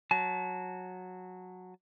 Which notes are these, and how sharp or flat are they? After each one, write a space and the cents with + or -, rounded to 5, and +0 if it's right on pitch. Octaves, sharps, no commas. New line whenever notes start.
F#3 -10 A5 -30